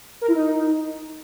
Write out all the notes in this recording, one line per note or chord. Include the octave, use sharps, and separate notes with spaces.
A#4
E4
D#4